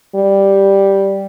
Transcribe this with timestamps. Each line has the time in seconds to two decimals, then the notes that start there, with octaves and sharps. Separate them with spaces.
0.15 G3